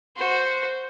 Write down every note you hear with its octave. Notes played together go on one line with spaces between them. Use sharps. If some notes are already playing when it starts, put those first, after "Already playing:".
F#4 C5